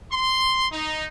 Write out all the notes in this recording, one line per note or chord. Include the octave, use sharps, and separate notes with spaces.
C6
D#4